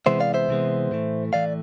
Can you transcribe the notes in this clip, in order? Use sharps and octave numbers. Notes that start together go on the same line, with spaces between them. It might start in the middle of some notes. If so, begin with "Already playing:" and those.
C3 E3 G#3 B3 C5 E5
D5 F5
C5 E5
C3 E3 G#3 B3
A2 E3 A3
A2 E3 A3 D5 F5